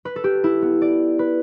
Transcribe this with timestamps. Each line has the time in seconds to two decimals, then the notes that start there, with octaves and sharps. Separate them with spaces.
0.05 B4
0.16 A4
0.24 G4
0.44 E4
0.62 B3
0.82 D5
1.19 B4